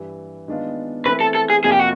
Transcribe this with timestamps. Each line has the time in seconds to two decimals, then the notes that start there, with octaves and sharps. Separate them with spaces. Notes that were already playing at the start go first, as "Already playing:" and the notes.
Already playing: G2 E3 G3
0.48 D#3 G#3 B3 D4 F4
1.05 E3 A3 C4 E4 B4
1.21 A4
1.35 A4
1.50 G#4
1.64 F2 C3 F3 A#3 G#4
1.72 G4
1.79 F#4